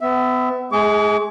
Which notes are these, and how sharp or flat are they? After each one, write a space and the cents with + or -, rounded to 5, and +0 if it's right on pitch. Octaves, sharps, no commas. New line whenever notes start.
B3 +35 E5 +0
G#3 +40 G#4 +0 D6 -45